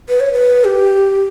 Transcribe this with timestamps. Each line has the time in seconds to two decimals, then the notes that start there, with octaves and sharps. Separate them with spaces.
0.09 B4
0.20 C#5
0.33 B4
0.65 G4